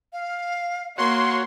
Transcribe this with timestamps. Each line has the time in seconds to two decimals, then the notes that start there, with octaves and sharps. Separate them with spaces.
0.13 F5
0.98 A#3 F#4 C#5 C6 C#6